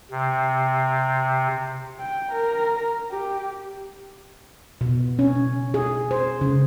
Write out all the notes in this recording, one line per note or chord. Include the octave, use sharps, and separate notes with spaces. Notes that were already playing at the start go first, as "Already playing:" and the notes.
C3
G5
A#4
G4
B2
C#4
G#4
C5
C#3